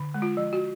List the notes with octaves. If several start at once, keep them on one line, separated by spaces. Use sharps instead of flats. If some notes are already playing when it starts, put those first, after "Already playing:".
Already playing: D3
G#3
F4
F3
F#4